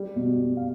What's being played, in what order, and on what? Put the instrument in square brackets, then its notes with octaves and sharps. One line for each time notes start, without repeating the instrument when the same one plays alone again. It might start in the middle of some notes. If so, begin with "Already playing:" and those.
Already playing: [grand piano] G3
B2
B2
F5